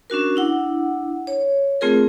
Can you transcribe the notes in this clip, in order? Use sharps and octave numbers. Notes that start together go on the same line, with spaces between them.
C#4 D4 F#4 A#4
D4 E4 F#5
C#5
A3 C4 F4 G#4 A#4